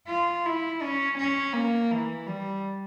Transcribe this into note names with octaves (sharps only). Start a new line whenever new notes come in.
F4
E4
C#4
C#4
A#3
E3
G3